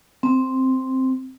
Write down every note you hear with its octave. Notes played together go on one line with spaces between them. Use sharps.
C4